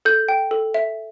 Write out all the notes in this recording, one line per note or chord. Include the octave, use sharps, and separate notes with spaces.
A4 G6
G5
A4
E5